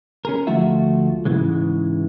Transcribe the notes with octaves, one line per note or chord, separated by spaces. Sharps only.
C#4 G#4 A#4
D2 F3 A3 F4 F#4 E5
G#2 C#3 E3 G#3